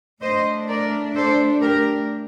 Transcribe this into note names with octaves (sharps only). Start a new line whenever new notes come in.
A2 A3 D4 C5 D#5
A#4 D5
A4 C5
G4 A#4